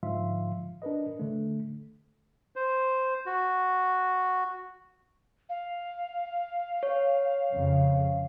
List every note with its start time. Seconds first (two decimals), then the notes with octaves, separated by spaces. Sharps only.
0.03 G#2 D3 F3 E5 F5 C6
0.82 D4 A#4 B4 D#5
1.19 D3 A3
2.56 C5
3.26 F#4
5.49 F5
6.83 C#5
7.53 F2 C#3